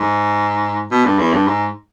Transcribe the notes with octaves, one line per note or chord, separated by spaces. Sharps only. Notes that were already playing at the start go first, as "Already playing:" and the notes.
Already playing: G#2
B2
G2
E2
G2
G#2